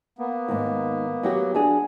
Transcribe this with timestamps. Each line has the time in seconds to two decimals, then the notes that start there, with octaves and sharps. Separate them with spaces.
0.19 A#3 B3
0.48 D#2 G#2
1.23 F#3 F#4 G4
1.54 D4 F#4 G#4